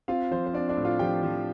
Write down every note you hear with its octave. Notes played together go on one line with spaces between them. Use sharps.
C4 F4 F5
F3 C5
C5
C4 D4 D5
D4 D5
A2
F4 F5
F3 G4 G5
F3